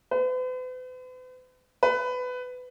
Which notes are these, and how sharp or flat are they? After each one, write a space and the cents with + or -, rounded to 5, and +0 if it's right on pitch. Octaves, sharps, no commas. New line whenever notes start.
B4 +45
B4 +20